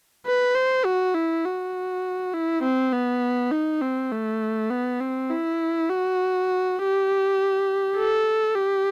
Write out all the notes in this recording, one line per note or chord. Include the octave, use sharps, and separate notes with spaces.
B4
C5
F#4
E4
F#4
E4
C4
B3
D#4
C4
A3
B3
C4
E4
F#4
G4
A4
G4